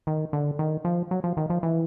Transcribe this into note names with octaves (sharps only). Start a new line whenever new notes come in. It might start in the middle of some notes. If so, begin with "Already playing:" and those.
D#3
D3
D#3
F3
F#3
F3
D#3
F3
E3